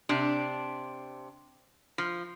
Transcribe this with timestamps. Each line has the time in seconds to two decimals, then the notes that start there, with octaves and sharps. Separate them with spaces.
0.09 C3 D4
1.98 F3